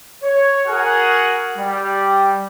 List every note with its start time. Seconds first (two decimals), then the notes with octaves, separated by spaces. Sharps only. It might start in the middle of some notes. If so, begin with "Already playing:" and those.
0.23 C#5
0.67 F#4 G#4 A#4 F#5
1.58 G3